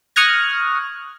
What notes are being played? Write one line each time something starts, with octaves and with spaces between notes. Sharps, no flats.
C#6 D#6 F6 F#6 G#6 A#6